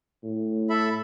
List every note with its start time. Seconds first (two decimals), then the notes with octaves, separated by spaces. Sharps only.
0.23 A2
0.70 A4 E5 B5